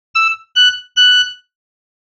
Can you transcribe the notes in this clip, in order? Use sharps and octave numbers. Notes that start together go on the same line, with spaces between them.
E6
F#6
F#6